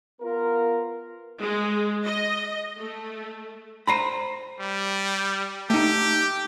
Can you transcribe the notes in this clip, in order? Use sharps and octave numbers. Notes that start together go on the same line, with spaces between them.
B3 F4 A#4
G#3
D#5
A3
C5 A#5 B5
G3
A3 D#4 G4